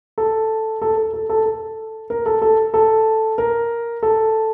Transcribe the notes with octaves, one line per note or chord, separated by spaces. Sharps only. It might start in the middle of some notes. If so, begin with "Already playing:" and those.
A4
A4
A4
A4
A4
A4
A#4
A4
A4
A4
A#4
A4